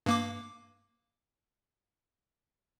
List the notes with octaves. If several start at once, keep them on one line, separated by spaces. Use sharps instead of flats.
G2 A#3 D6